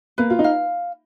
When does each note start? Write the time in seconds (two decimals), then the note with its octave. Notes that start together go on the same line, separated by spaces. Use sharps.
0.18 A#3 B4
0.30 F4
0.39 D#4
0.44 F5